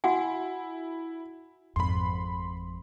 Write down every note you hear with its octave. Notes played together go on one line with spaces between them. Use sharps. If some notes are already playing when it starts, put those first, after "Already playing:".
E4 F#4 F#5 G#5
G#1 F2 B5 C6